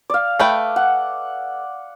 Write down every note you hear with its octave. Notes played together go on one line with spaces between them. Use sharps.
D5 F5
A3 B4 G5
F#5